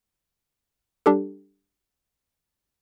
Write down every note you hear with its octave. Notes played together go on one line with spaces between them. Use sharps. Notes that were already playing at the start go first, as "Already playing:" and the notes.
G3 D4 G4 A4